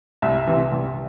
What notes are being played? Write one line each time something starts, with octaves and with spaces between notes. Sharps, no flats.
C2 E5
C3 E3
C2